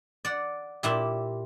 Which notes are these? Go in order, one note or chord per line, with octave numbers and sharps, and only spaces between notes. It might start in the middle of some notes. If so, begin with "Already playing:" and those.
D5 F#5
A#2 E4 G4